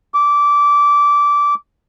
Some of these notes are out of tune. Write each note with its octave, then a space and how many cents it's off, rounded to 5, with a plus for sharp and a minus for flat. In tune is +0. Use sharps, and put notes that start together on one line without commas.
D6 -15